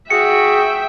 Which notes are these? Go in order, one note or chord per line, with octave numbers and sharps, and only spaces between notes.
F#4 G#4 E5 G5 C#7